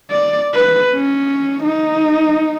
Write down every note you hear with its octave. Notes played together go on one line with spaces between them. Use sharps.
D5
B4
C#4
D#4